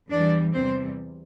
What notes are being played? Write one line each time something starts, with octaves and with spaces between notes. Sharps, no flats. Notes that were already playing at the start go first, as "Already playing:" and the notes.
E2 E3 G3 D4 D5
E2 C3 E3 G3 C4 C5